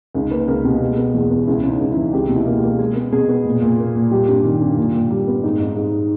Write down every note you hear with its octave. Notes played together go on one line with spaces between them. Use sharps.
C#2 D#4
A#3 B4
C#2 A#4
B2 G4
G#3
B3
E2
B3
C#2 E4
C#3
D#4
C#2
E4
E3
C#2 G4
B2
E4
A#3
G4
A#3
G#3 G#4
B3
B2 G#4
B3
A#2
A#2
A#3
A#2
G3 G4
G2
D#3
G2
A#2
A#2
G3
B3
G#2 D#4
G#2
G#2